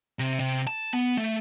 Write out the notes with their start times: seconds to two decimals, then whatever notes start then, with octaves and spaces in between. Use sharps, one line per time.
0.19 C3
0.40 C3
0.67 A5
0.93 B3
1.17 A3